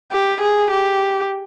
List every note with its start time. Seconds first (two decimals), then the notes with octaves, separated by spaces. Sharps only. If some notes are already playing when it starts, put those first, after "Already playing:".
0.12 G4
0.41 G#4
0.71 G4